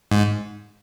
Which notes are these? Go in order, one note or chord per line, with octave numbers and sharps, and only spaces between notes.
G#2